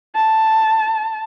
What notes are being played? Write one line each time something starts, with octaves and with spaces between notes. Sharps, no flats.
A5